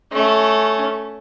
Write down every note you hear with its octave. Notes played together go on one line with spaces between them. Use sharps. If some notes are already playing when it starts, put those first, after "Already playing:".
A3 C#4